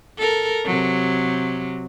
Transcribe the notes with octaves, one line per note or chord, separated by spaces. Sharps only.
A4 A#4
C3 F#3